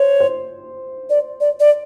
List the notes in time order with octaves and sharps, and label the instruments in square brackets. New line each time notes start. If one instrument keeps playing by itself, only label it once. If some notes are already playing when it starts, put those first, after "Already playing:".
Already playing: [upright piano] C5 [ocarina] C#5
[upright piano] C5
[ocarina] D5
D5
D5